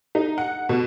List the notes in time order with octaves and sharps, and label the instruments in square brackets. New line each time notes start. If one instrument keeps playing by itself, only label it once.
[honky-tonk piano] D#4
F#5
B2